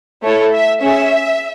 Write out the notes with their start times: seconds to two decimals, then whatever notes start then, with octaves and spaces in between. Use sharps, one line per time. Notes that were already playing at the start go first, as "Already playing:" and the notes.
0.23 A3 E4 A4 C#5
0.52 E5
0.81 C#4 G#4 E5